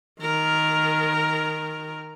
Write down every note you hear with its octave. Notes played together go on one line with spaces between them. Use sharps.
D#3 A#4